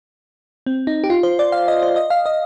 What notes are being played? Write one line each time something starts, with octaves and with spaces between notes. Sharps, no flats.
C4
D#4
G4
F4
C5
D5
F5
D#5
C5
D#5
F5
D#5